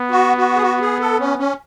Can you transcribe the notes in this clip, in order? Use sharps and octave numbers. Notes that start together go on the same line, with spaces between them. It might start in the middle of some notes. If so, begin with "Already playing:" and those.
Already playing: B3
F#4
F#4
G#4
F#4
G#4
A4
C#4
C#4